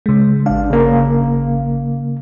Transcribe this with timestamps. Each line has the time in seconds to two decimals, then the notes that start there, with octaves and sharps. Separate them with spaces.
0.06 C#3 G#3
0.46 G#1 D4 F5
0.70 C#3 A#3